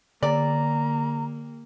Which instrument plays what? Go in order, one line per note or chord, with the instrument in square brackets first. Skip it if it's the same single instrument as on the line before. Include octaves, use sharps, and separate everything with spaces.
[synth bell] D3 [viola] A#3 [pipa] D5 [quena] A#5